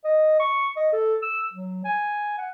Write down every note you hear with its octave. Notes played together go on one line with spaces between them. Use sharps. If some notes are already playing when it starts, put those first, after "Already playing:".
D#5
C#6
D#5
A4
E6
F#3
G#5
F#5